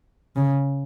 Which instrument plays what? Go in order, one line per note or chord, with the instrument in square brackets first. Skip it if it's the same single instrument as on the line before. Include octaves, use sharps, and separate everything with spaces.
[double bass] C#3